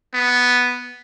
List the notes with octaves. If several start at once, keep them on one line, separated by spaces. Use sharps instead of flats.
B3